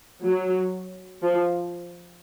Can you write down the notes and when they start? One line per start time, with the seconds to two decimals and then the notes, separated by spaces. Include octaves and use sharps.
0.23 F#3
1.22 F3